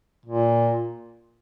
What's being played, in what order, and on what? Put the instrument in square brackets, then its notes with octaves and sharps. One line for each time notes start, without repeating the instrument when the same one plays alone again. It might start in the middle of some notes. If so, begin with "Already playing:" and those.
[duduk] A#2